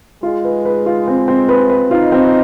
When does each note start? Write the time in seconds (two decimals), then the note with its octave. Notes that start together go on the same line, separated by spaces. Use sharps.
0.23 G#3 F4
0.44 B4
0.65 B4
0.86 F4
1.07 C4
1.28 C4
1.49 B4
1.69 B4
1.91 D#4 F4
2.12 C4